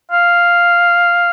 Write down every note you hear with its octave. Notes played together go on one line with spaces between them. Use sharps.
F5